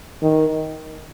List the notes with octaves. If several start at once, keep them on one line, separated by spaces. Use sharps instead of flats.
D#3